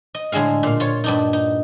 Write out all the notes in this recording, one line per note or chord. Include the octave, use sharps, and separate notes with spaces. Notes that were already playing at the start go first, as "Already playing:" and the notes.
D#5
A2 D3 G#3 G#4 F5
A#2 F5
F4 C#5
G2 D4 D#4
D#4